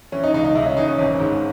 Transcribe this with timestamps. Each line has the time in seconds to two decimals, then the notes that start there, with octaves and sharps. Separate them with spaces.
0.12 E3 C#4
0.23 D#4
0.34 C#2 D#4
0.45 D#4
0.55 C#2 E4
0.66 C#4
0.77 E3 D#4
0.88 C#4
0.99 G#1
1.20 G#2